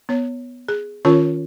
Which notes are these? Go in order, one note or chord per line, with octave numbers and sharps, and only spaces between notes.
B3 C#5
G#4
D#3 C#4 F4 A#4 C#5 A5